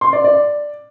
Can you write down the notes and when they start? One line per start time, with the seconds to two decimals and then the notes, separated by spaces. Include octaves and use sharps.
0.01 C6
0.13 D5
0.24 D5